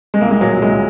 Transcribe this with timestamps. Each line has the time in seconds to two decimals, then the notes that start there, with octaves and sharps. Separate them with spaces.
0.14 G#3
0.21 C2 A#3
0.31 G#3
0.41 A#2 F#3
0.51 F#3
0.62 C2 G#3